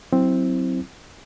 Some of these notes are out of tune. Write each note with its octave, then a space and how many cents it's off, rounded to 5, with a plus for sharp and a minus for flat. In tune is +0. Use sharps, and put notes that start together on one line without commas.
F#3 +0 C4 +5 E4 +0